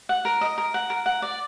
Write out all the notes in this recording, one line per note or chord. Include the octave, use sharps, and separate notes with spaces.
F#5
A#4
D#5
A#4
F#5
A#4
F#5
D5